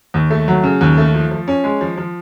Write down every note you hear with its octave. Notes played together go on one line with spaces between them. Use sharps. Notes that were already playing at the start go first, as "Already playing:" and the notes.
D#2
A3
F#3
C#3
D#2
A3
F3
F3
C#4
G#3
F3
F3